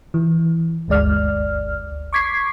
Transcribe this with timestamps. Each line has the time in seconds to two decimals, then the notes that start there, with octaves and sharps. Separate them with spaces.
0.14 E3
0.88 G1 D2 G#3 D5 F6
2.13 C#6 D6 G#6 B6 C7